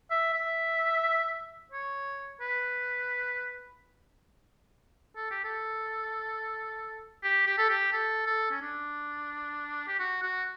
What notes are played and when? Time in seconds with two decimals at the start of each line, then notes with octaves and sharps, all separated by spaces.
0.11 E5
0.34 E5
1.72 C#5
2.41 B4
5.16 A4
5.31 G4
5.45 A4
7.24 G4
7.47 G4
7.58 A4
7.69 G4
7.93 A4
8.27 A4
8.51 C#4
8.62 D4
9.88 G4
9.99 F#4
10.22 F#4